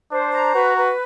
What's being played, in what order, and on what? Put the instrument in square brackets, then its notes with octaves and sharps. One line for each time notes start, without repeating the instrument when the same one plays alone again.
[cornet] D4 [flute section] C5
[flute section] A#5
[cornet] F#4 [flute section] B4
[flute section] B4